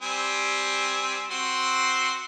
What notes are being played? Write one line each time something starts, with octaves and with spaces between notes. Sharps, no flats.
G3 C4 G#5
C4 F#4 C6